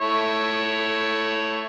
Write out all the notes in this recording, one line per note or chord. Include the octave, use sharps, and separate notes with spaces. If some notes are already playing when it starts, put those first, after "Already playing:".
A3 E4 C#5